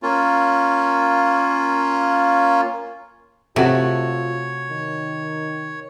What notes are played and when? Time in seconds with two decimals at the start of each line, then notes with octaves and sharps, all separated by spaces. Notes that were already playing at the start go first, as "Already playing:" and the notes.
0.03 A#3 C#4 F4
3.56 C3 A3 F4 F#4 C#5
4.70 D#3